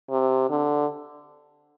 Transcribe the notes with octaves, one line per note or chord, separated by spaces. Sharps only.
C3
D3